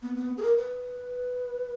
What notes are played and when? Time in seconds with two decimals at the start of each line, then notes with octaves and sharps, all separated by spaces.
0.03 B3
0.16 B3
0.38 G#4
0.42 A#4
0.57 B4